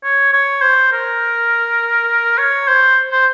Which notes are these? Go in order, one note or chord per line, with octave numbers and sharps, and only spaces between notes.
C#5
C#5
C5
A#4
C#5
C5
C5